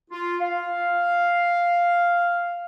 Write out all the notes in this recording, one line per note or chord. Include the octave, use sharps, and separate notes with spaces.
F4
F5